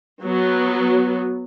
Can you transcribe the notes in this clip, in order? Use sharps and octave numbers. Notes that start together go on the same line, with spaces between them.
F#3 B3